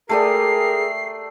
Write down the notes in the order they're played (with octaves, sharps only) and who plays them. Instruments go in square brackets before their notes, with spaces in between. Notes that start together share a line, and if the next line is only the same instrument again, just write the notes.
[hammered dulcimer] A3 G4 D5 [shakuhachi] G#4 [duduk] A#4 [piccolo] C7